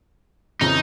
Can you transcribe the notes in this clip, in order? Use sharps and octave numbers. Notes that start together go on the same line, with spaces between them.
F2 C#3 E3 D#4